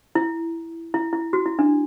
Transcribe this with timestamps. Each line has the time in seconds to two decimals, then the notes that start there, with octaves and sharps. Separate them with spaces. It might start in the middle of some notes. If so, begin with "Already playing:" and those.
0.15 E4
0.94 E4
1.13 E4
1.33 F#4
1.46 E4
1.59 D4